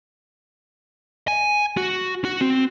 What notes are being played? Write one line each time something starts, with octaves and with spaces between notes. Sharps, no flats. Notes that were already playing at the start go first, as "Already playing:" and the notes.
G#5
F#4
F#4
C4